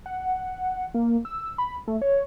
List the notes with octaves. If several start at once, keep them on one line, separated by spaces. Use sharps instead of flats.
F#5
A#3
E6
B5
A3
C#5